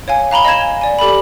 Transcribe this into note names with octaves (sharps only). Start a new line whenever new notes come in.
C#5 F5 G#5
F5 A#5 B5 G7
D#5 F5 A#5 G#6 E7
G#5
D5 G#5
G4 A4 D5 B5